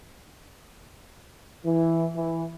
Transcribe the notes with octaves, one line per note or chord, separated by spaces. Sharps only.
E3
E3